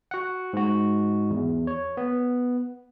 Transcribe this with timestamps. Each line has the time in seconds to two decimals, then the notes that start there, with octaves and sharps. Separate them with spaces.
0.11 F#4 F#5
0.53 G#2 F#4
1.31 E2
1.67 C#5
1.97 B3